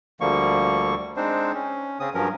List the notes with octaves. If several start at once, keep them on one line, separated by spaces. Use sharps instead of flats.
D2 D3 F3 G3 A#3 C#6
G#3 C4 D4 D#4 C5
C#4
C#3 C4 C#4 D#6
G2 F3 F#3 C#4 A#4